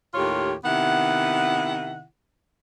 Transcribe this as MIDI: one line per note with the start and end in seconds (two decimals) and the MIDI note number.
0.14 0.54 39
0.14 0.54 45
0.14 0.54 65
0.14 0.54 67
0.14 0.54 73
0.64 2.04 48
0.64 2.04 51
0.64 2.04 59
0.64 2.04 64
0.64 2.04 78